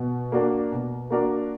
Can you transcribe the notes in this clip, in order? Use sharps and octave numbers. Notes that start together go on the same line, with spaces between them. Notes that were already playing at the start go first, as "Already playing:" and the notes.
Already playing: B2
A#3 D4 F#4 A#4
B2
A#3 D4 F#4 A#4